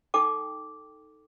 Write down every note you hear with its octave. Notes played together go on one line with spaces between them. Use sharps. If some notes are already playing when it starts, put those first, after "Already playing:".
D#4 A4 G5 D6